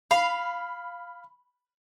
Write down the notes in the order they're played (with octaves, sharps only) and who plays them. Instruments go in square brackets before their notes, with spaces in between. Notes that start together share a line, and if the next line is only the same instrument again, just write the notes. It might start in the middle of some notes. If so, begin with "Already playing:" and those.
[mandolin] F5 [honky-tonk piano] B5